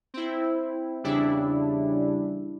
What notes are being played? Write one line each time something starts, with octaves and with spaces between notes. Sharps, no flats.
C4 E4
E2 C#3 G3 D4 E4